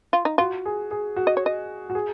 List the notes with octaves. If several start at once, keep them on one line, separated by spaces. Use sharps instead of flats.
F4
D#4
F4 F#4
G#4
G#4
F#4
D#5
C#5
D#5
F#4
G#4